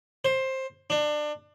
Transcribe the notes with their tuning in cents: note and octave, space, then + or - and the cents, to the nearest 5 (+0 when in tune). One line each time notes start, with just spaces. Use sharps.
C5 +15
D4 +25